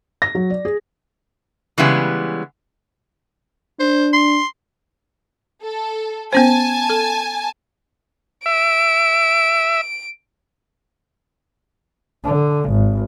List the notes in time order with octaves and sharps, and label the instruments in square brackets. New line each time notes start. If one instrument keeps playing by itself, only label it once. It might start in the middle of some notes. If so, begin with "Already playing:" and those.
[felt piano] A#6
F#3
D5
G#4
[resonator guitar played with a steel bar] C#3 E3 G3 G#3 B3
[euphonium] D4 [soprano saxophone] C5
[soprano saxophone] C6
[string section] A4
[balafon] B3 C#4 C5 [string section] G#5 A5
[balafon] A4
[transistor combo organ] E5 [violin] D7
[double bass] D3
G#1